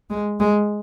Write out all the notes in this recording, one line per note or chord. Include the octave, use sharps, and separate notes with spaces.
G#3
G#3